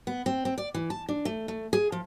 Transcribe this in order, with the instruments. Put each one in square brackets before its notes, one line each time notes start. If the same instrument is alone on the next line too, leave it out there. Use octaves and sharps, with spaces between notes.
[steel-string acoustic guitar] B3
C4
C4
D5
E3
A5
D4
A3
A3
G#4
F3